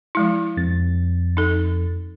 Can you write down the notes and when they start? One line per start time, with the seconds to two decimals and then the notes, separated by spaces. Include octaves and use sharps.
0.15 F3 G#3 E4
0.57 F2 A6
1.37 D#4 A4